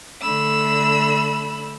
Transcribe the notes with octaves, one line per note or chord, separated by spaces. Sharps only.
D3 A3 B5 E6